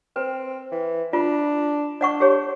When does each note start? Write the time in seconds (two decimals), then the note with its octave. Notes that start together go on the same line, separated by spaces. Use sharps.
0.16 C4 B4
0.72 E3
1.13 D4 F4
2.01 D4 D5 F#5 C#6
2.20 G4 G#4 C#5